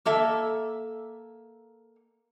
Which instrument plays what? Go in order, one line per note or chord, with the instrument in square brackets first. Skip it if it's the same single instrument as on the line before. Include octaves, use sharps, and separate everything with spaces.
[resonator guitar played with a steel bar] A#3 A4 E5